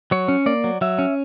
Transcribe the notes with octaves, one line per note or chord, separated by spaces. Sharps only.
F#3 C#5
C#4
A#3 D5
F#3
F#3 E5
C#4